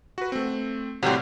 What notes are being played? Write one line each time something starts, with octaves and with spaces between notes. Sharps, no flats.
F#4 B4
A3 C4
A2 C3 F#3 G3 C4